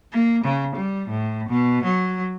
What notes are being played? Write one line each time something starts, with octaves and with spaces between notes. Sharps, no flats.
A#3
C#3
G3
A2
B2
F#3